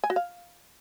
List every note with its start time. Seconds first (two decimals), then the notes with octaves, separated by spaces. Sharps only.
0.04 G#5
0.10 F#4
0.16 F5